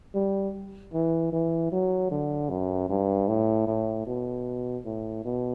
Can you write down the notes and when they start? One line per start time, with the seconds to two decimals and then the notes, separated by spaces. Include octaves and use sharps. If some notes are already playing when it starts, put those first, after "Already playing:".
0.15 G3
0.93 E3
1.32 E3
1.72 F#3
2.11 D3
2.50 F#2
2.90 G2
3.28 A2
3.67 A2
4.07 B2
4.85 A2
5.25 B2